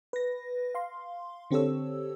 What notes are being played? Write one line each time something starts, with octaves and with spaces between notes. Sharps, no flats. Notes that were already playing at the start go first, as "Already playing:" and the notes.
B4 A#6
F5 C6
D3 C4 G4 A4 C#5 E6